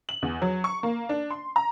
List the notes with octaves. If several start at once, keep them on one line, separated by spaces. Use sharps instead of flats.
F#7
E2
F#3
C#6
A#3
D4
C6
A#5